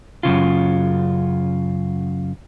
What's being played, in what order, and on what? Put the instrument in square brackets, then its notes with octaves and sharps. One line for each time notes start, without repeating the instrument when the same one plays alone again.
[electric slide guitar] F#2 A#2 C#3 F4